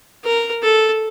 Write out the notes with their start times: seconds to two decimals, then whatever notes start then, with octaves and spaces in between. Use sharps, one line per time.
0.24 A#4
0.63 A4